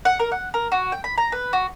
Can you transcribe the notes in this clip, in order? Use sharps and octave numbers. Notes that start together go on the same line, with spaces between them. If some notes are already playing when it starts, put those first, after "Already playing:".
F#5
A#4
F#5
A#4
F#4
G5
B5
A#5
B4
F#4